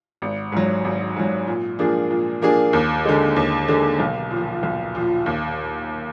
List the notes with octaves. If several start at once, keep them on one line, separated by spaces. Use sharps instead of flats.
G#1
G#2 F#3
G#1
G#2 F#3
A#2
F3 A#3 D4 G#4
A#2
F3 A#3 D4 G#4
D#2
D3 G#3
D#2
D3 G#3
B1
A#2
F3
B1
A#2 F3
D#2